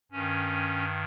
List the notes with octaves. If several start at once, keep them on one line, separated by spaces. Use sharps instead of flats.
G2 D#3 C#4